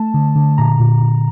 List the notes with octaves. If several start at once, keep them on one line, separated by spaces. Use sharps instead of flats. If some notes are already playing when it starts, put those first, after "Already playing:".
Already playing: A3 A5
D3
D3
A#2 A#5
A#2
A#2